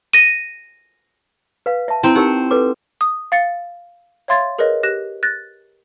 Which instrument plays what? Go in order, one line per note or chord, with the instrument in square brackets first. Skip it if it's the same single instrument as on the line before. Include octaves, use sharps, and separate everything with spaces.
[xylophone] A#6 D#7
[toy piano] B4 F5
E5 A5
[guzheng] C4 C5 [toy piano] E4
[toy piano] D#4 G4 A#4 [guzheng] F#5
[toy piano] A4 B4 D6
[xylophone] D#6
F5 A6 C#7
C#5 E5 F5 C6 G#6 A6
G#4 A#4 B4 C#5 D#5
G4 F#6 A#6 E7
F#6 A6 A#6